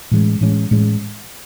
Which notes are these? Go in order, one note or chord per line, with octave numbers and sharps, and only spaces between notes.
A2 E3 G#3 C#4
A2 E3 G#3 C#4
A2 E3 G#3 C#4